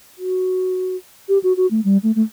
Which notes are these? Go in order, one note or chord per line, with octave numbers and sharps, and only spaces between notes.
F#4
G4
F#4
F#4
A3
G3
A3
A3